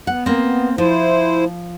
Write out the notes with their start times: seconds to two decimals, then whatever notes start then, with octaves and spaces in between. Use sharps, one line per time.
0.07 B3 F#5
0.26 A#3 C4
0.78 F3 E4 C5